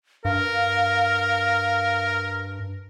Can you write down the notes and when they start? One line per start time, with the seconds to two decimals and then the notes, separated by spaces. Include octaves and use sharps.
0.25 G2 A#4 F5